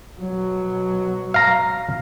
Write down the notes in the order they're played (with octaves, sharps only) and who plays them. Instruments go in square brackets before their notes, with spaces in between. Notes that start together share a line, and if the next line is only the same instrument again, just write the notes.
[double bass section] B2 F#3
[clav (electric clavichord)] F5 A#5